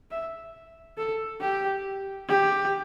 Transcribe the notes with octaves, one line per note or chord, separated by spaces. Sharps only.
E5
A4
G4
G4